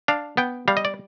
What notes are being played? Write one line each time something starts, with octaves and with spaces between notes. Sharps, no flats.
D4 F5
B3 G5
G3 F5
D#5
D5